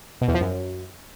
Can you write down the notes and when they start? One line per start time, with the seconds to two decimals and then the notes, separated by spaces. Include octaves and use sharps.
0.21 B2
0.28 E2
0.34 F3
0.41 F#2